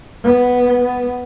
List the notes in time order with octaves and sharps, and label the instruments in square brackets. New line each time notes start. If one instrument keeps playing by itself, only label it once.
[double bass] B3